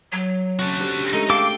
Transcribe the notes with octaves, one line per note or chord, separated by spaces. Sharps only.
F#3
C4 C#4 F#4 A4
D4 G4 C5
G#3 A3 D#4 A4
A4 F5 G5 D6 A6